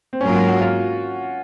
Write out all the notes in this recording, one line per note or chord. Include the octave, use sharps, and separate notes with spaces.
C4
G#2 F#3 A#3 C#4 F4 A#4
F#4
F#4
F4